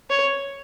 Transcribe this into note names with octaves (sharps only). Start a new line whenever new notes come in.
C#5